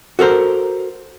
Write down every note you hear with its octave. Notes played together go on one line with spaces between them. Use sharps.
F#4 A4 A#4 C5